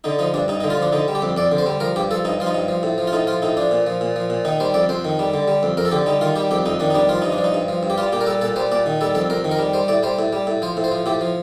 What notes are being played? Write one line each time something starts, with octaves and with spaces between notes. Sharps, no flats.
D3 D#4
F3 D#4
G2 D4
G2 D#4
D#4
D3
F4
F3 D4
D3 D#4
G3
G4
F2
F2 D5
D3
C5
G3
F3 A#4
G2 G4
F3 A4
G2 D#4
F3 F4
D#4
G2
F3
A2
F3
F4
A2 D#4
F3 F4
A2 D#4
F3 D4
A#2
F3
A#2
F3
A#2
D#3 D#4
G3 C5
F2 D5
F2 C5
D#3
G3
D3
G3
F2
F2 A#4
A4
D3 G4
G3 D#4
D#3 F4
G3 G4
F2 G4
F2 D#4
D#3 D4
D#4
G3 D4
F3 F4
G2 D#4
D4
F3
D#4
G2
F3
G2
G4
G3 F4
A#2 G4
A#4
G3 A4
A#2 A4
G3 C5
A#2 D5
D#3
G3 A4
F2 A4
F2 A#4
D#3
A#4
G3
G3 C5
A2 D5
G3 C5
A2
G3
A2
F3 C5
A2
C5
F3
A2 G4
F3